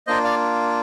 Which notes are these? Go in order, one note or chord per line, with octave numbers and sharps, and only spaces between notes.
A#3 D4 F4 C5 D#5
D5 F5